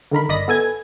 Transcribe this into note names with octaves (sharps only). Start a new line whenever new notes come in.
D3 D#3 A#4 B5
G1 D5 D#5 B5 A#6
B3 A4 G#5 G#6